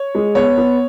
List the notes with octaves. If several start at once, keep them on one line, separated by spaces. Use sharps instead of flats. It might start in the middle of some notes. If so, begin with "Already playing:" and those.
Already playing: C#5
G#3
B3 C#5
B3